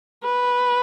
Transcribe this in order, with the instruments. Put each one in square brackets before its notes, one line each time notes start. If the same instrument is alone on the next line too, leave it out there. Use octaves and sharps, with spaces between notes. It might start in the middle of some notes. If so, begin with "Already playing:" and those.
[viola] B4